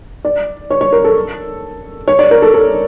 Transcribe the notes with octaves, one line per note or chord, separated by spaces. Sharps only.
D5
C#5
C#5
A#4
A4
C#5
D5
A#4
A4
A4